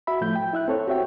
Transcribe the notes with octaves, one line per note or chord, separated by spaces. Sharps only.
F#4 E5 B5
A2 F3 A3 G6
G5
E4 E5 F#6
C4 A4 C#5
F#4 G4 C#5 E5 G5